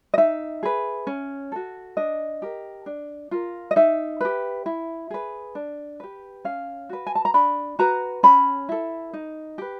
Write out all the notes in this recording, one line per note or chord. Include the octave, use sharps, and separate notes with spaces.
D#5
D#4 E5
G#4 B4
C#4
F#4 A4
D4 D#5
G4 A#4
D4
F4 A#4
D#5
D#4 E5
G4 B4
E4
G#4 B4
D4
G4 B4
C#4 F5
F#4 B4
G#5
A5
A#5
D4 B5
F#4 B4 A#5
C#4 B5
E4 A4
D#4
G4 B4